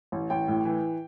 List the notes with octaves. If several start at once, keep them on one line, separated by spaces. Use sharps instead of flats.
A1
A1 G5
A2
E3